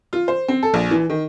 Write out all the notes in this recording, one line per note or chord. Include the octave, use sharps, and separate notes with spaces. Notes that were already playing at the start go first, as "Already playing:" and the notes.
F4
C5
C4
A4
A#1
E3
D#3